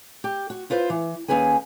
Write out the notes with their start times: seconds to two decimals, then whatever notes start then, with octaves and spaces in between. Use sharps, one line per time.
0.24 G4
0.50 F#4
0.70 E4 F4 B4 C5
0.90 E3
1.28 D#2 C#4 G#4 B4 G#5